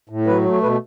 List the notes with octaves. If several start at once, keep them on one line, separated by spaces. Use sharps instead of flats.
A2
F#3 B4
A3
B2 B4